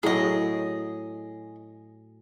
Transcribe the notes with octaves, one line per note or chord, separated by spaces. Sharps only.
A2 F#3 G#4 D#5 G5